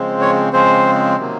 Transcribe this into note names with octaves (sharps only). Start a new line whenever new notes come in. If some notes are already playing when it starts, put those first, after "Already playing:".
Already playing: C#3 F3 G#3 C4
C#5
C#3 F3 G#3 C4 C5
C3 D#3 F#3 A#3